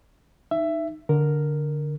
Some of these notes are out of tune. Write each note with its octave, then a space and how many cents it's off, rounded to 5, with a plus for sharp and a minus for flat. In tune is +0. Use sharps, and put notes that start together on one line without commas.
D#4 -10 E5 +15
D3 +0 A#4 +0